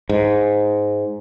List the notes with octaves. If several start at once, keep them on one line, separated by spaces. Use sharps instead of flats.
G#2